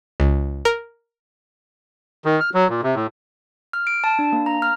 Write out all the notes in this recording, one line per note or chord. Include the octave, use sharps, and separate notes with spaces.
C#2
A#4
D#3
F6
F#3
A#2
C3
A2
F6
D7
A5
D4
A#3
A#5
F6